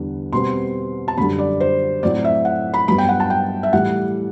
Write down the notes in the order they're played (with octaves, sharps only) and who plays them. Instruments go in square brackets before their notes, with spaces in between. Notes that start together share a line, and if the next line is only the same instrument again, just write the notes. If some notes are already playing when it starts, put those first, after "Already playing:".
Already playing: [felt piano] E2 D3 G3 B3
B2 G3 C4 C6
A5
F#2 D3 G3 B5
D5
C5
A2 F#3 C4 D5
E5
F#5
B5
G2 F#3 B3 B5
G5
F#5
A5
G5
E5
A2 E3 G3 F#5